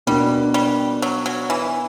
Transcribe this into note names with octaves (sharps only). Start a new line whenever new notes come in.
B2 G3 A#3 D4 F#4
G3
F#3
F#3
E3